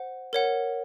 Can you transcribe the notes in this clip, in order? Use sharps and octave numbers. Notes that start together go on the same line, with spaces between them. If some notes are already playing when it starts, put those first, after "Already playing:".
Already playing: C5 F#5
A#4 C#5 F#5